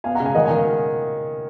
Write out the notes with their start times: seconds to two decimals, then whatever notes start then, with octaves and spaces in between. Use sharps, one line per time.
0.04 B3 F5 G#5
0.15 F#5 A#5
0.20 C#3
0.25 F5 G#5
0.35 D#3 D#5 F#5
0.45 F5 G#5
0.51 D#3